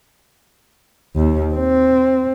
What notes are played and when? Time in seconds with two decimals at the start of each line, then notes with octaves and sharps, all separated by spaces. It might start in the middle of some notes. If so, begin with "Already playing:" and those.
1.16 D#2
1.54 C4